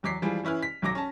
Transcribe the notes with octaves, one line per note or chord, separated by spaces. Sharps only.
E2 F#3 D6 B6 C7
E3 F3 G3 G#3
E3 C#4 E4 B4 F6
B6
B1 F#3 D6 A#6
C#4 A5